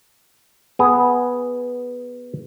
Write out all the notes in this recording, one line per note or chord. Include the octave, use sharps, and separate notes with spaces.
B3 G#4